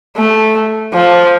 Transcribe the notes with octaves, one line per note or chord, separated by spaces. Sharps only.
A3
F3